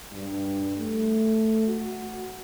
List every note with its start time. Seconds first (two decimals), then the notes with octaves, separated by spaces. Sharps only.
0.12 G2
0.78 A3
1.67 F#4